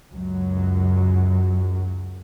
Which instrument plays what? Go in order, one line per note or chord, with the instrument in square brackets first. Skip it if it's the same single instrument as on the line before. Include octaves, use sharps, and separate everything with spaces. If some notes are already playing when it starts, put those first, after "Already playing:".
[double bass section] C#2 F#2 F#3